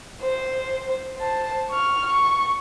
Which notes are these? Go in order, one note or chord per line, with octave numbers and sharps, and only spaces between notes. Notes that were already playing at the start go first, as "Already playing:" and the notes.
C5
C5 A5
C#6 F6
C#6